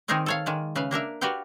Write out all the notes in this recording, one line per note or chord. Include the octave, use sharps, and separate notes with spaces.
D#3 C4 D#4 G#4 A#4 D5
A4 C#5 F5
D#3 G#3 D5
C#3 B4 E5 F5
A#3 D4 A#4 E5
F#4 G4 B4 D5 F5 G5